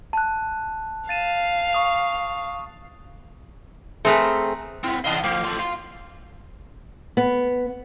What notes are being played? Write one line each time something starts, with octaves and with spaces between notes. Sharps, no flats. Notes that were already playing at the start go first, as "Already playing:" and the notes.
A5 F#6
F5 A6 D#7 E7
C#6 D#6 F7
A3 C4 G#4 A#4 B4
B3 C4 E4
E2 C3 D#5 F5 A5
F3 A3
F4 A4
F5 C6
B3